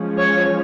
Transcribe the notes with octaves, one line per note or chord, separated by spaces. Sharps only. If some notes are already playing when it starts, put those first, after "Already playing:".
Already playing: F3 G#3 C#4
C#5